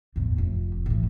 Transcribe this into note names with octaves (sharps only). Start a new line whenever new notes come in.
E2 A2
F1
A2 E3